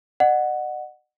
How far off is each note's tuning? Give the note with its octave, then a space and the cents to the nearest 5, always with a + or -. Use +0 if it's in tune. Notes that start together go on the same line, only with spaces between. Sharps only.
D#5 -45 F#5 +0